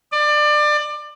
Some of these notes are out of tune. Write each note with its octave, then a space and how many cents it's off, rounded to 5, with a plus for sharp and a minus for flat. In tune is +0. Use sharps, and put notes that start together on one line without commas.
D5 +25